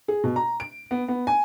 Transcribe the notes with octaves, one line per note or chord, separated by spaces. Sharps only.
G#4
B2
A#5
D7
B3
B3
G#5